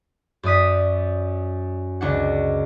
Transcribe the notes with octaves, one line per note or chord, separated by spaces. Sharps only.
F#2 D5 D#6 B6
C#2 D4 F#5